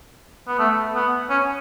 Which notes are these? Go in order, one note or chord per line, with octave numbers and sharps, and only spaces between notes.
B3
A3
B3
C#4